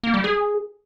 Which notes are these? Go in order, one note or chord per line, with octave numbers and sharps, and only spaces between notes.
A#3
G3
G#4